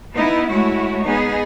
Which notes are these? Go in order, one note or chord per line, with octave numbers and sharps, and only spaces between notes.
B3 D#4 E4
G#3 A3 E4 F#4 C#5
B3 D#4 G#4